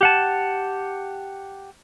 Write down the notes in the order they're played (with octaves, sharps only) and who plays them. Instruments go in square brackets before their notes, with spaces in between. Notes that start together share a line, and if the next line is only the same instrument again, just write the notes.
[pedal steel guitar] G4 F#5 A5